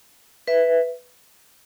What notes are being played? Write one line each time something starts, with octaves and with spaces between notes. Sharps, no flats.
B4 E5